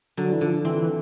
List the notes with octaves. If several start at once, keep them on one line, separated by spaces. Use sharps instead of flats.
D3 F#3
E3
D3 F3
E3 C4
E3